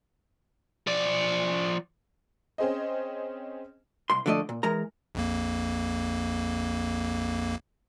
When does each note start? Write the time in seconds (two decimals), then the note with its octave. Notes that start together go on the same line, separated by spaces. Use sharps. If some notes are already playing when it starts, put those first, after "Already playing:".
0.87 F3 D5
2.58 C4 C#4 G#4 C5 D#5
4.10 C2 C6
4.26 D3 F3 A3 D5 D#5
4.49 A#2
4.63 E3 G#3 A#4 A#5
5.15 A#1 F2 A#3